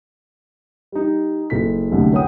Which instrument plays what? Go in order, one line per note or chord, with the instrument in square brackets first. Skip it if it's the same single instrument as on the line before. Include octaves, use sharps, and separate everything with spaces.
[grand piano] G3 D#4
F#1 A4 B6
C2 F#2 A2 D3
G4 A#4 C#5 F#5 G5 D#6